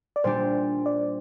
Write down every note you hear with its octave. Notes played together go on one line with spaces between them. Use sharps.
D5
A#2 G3 D4 G4 C5
D5